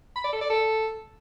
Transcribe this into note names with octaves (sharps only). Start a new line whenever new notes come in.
B5
D5
A4
D5
A4